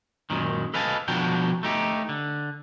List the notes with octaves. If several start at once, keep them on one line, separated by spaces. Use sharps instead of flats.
F#2 A#2 D#3
A4 B4 D#5 F5 G#5 A5
B2 F3 D4 F#4 A#4 G5
A3 D#4 G4
D3